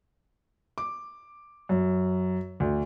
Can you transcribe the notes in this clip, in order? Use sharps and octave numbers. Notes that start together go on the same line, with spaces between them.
D6
F#2
D2